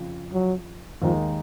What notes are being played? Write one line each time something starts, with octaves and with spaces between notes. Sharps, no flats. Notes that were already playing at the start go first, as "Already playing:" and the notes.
Already playing: F2 C#3 F3
F#3
D#2 D#3 F3 G#3 D#4